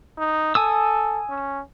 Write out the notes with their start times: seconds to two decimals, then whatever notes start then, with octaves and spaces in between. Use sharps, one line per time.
0.18 D#4
0.55 A4 G#5 D#6 E6
1.29 C#4